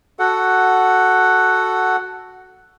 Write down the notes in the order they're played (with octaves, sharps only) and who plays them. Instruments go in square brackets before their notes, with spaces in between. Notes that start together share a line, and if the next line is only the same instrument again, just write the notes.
[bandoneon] F#4 A4 F#5